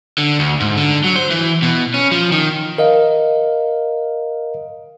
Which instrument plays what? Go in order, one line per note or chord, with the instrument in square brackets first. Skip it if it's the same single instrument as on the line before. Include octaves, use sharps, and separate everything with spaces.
[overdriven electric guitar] D3
D2
G#2
D3
F#3
C5
E3
B2
C#4
F3
D#3
[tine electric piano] A#4 D#5 F5